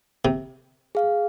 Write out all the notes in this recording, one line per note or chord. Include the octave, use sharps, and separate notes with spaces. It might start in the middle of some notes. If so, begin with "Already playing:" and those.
C3
G#4 F5